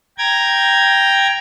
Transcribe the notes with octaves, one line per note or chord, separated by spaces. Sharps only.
G5 A#5 G#6